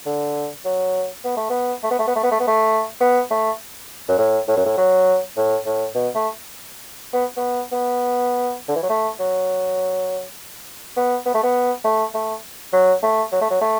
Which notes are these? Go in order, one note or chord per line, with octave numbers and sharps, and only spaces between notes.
D3
F#3
B3
A3
B3
A3
B3
A3
B3
A3
B3
A3
B3
A3
B3
A3
F#2
A2
A2
F#2
A2
F#3
A2
A2
B2
A3
B3
B3
B3
D3
E3
F#3
A3
F#3
B3
B3
A3
B3
A3
A3
F#3
A3
F#3
A3
F#3
A3